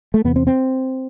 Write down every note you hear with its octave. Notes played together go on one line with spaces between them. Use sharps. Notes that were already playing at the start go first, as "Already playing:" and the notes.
A3
E2 C3 B3
C4
C4